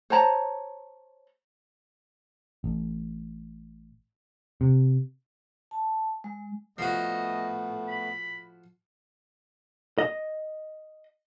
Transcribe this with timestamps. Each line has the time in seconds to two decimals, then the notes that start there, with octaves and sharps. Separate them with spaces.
0.10 C5 C#5 A5 A#5
2.64 A1
4.61 C3
5.71 A5
6.24 G#3
6.78 A2 F3 A3 B3 F#4 D#5
7.88 B5
9.99 D#5